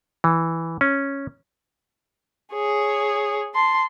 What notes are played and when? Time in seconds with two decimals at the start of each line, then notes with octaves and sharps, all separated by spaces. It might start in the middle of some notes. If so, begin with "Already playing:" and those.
0.24 E3
0.81 C#4
2.52 G#4 C#5
3.55 A5 C6